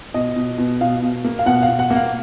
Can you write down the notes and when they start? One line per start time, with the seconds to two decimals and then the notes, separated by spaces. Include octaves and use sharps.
0.14 B2 D#5
0.36 B2
0.58 B2
0.81 B2 F5
1.02 B2
1.24 A#3
1.39 F5
1.46 B2 F#5
1.62 F5
1.69 B2
1.79 F#5
1.90 A#3
1.96 F5